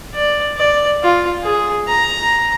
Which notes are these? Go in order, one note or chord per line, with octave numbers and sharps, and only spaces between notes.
D5
D5
F4
G#4
A#5